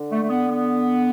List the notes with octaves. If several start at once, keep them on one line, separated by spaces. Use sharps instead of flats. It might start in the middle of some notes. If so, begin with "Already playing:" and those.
Already playing: D3
A3
A3
B3
B3